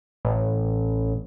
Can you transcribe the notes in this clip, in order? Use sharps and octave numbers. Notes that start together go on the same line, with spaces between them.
A1